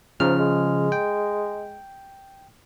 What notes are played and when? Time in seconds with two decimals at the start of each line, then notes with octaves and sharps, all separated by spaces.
0.20 G#2 C#3 F3 F6
0.40 G#3
0.92 G5